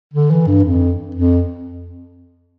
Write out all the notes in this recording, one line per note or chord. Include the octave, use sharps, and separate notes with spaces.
D3
E3
G2
F2
F2